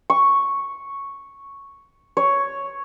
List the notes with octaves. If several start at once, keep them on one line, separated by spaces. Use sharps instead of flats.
C#6
C#5